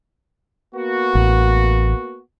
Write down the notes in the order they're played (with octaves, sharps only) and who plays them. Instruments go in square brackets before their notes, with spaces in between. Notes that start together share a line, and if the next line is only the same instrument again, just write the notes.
[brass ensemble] A#3 B3 F#4
[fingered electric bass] A1